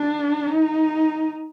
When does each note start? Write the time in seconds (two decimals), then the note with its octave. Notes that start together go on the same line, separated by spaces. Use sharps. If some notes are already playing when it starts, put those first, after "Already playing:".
Already playing: D4
0.47 D#4